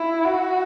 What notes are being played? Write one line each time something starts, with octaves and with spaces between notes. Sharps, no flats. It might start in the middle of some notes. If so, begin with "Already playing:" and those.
Already playing: E4
F#4